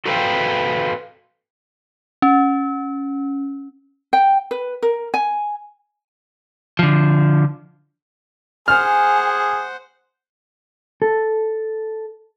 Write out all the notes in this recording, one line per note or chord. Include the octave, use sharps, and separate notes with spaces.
F#4 A4 B4 C5 F5 G5
C#4
G5
B4
A#4
G#5
D3 F3
G#4 C5 F#5 G#5 F6
A4